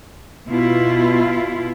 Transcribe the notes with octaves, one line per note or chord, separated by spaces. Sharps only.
B2 E4 F4